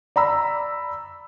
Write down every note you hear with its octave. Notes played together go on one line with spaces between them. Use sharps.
D5 A#5 B5 E6